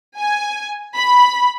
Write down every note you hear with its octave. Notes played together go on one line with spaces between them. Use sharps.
G#5
B5